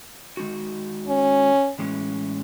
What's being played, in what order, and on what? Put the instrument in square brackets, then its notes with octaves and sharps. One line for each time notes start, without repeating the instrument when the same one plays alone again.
[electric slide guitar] D#3 G#3 D#4 F#4
[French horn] C#4
[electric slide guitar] A2 E3 G#3 C#4